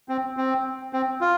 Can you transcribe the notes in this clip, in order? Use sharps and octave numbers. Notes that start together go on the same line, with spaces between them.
C4
C4
C4
F4